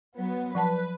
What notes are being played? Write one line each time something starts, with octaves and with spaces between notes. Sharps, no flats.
F#3 B3
F3 B4 F#5 A5